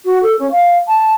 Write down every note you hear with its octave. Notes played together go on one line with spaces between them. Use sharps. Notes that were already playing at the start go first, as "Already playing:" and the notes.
F#4
A4
C#4
F5
A5